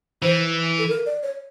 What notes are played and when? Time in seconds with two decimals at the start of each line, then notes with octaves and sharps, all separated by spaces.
0.22 E3 C5
0.79 A4
0.89 A#4
1.06 D5
1.23 C#5